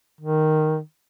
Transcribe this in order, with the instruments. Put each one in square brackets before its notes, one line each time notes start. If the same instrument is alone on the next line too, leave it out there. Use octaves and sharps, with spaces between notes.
[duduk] D#3